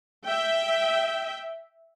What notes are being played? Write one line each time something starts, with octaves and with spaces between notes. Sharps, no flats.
E5 G5